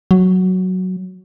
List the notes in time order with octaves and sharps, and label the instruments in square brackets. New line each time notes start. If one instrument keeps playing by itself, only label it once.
[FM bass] F#3